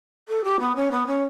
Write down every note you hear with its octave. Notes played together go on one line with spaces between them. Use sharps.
A4
G4
B3
C#4
B3
C#4